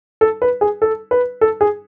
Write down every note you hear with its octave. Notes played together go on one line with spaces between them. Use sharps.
A4
B4
G#4
A4
B4
A4
G#4